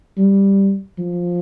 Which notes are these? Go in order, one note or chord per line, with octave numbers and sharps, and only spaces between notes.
G3
F3